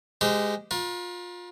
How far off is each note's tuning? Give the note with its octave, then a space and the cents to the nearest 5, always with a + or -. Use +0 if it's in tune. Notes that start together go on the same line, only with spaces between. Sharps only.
G#3 -5 G4 +0 C5 -40
F4 +25 A#4 +45